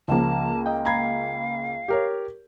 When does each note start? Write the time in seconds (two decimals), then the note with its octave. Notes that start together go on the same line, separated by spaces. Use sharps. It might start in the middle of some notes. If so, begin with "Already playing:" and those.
0.08 C#2 C#3 F3 A#3 A5
0.66 D#5 G5
0.85 F5 A#5 B5 G#6
1.88 G4 A#4 C#5